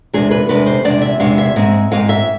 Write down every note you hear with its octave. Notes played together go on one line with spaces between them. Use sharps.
E2 C3 G#3 D4 G#4
B4
E2 C3 G#3 D4 B4
C5
E2 C3 G#3 D4 D5
E5
E2 C3 G#3 D4 F5
E5
G#2 G#3 C4
G#2 G#3 C4 F5
E5